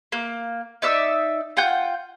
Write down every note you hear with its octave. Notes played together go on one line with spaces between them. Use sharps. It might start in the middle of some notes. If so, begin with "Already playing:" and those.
A#3
D#4 D5 E5 E6
F4 F#5 G5 G6